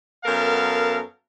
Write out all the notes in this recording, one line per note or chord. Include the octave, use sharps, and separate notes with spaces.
F#2 B3 A4 A#4 F5 A5